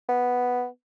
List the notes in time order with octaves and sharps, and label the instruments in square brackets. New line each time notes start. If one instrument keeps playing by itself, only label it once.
[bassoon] B3